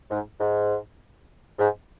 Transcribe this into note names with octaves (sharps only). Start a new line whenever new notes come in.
G#2
G#2
G#2